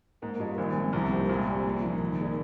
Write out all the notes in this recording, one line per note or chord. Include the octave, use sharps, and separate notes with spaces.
G#2 A#3
G2 F4 A#4 D#5
A#1 A#2 D#3
G#3 C4
C2 C3 F3
A#3 D#4 G4 C5
A#1 A#2 G#3
C4 G4 D5
A#2
F3 A#3 D#4
D#3
A#3 D#4 G#4 D5